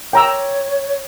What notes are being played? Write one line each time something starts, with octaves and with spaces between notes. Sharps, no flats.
C#5 G5 A#5 E6